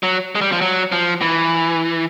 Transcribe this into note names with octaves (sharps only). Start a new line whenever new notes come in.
F#3
G#3
G3
F3
F#3
F3
E3